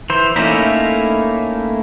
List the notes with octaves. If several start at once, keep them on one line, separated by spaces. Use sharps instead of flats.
E3 C5
A3 A#3 C#4 D#4 E4